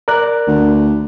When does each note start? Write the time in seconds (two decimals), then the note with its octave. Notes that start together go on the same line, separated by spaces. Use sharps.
0.08 A#4 D5 F#6
0.47 D2